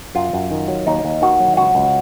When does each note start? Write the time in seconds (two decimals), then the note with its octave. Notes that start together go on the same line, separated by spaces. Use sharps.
0.15 F#2 F4
0.33 F#2
0.51 D#3
0.68 F#3
0.87 D#2 D#4
1.05 D#2
1.22 D#3 F#4
1.40 F#3
1.57 C#2 F#4
1.75 C#2